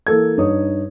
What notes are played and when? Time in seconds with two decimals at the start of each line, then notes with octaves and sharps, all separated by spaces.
0.07 E3 A#3 A4 G#6
0.37 G2 D#4 C#5 D#6